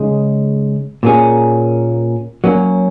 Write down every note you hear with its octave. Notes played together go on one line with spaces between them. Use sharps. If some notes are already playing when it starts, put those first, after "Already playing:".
Already playing: C#3 G#3 D#4 G#4
A#2 A#3 C#4 G#4
F#3 A#3 C#4